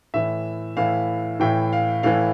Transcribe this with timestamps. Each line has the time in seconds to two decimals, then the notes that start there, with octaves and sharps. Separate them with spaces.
0.14 A2 E3 E5
0.77 A2 E3 F5
1.40 A2 E3 G5
1.73 F5
2.03 A2 E3 F5